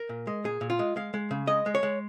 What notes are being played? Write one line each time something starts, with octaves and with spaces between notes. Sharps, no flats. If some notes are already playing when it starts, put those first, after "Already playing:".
Already playing: A#4
A#2
G#3
A#2 G#4
A#2
F4
G#3
G#3 F5
G#3
C#3
G#3 D#5
G#3
C#5
G#3